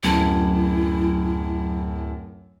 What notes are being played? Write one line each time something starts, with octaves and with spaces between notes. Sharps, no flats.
D1 F#2 E4 A5